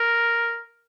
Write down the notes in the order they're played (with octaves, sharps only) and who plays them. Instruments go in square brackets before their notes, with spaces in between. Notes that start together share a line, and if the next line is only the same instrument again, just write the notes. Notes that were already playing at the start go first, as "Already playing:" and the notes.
Already playing: [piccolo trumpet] A#4